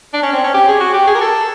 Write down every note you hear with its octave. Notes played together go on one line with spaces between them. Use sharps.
D4
C#4
C4
C#4
G4
G#4
F#4
G4
G#4
A#4
A4